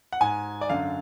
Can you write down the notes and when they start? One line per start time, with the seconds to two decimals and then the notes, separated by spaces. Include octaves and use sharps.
0.13 F#5
0.21 G#2 G#5
0.61 D5
0.69 F#2 D3 F5